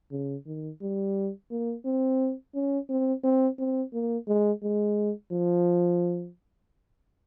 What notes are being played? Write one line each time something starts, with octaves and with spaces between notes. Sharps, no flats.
C#3
D#3
G3
A#3
C4
C#4
C4
C4
C4
A#3
G#3
G#3
F3